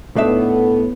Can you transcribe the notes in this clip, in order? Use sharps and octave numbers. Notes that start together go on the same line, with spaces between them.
A2 A3 B3 D4 D#4 E5